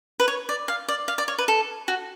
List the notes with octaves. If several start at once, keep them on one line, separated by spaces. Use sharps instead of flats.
B4
C#5
D5
F5
D5
F5
D5
C#5
B4
A4
F#4